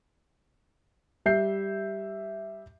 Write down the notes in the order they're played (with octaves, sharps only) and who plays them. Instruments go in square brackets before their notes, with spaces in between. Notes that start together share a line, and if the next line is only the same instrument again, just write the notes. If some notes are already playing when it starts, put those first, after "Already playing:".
[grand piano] G3 E5 G6 C7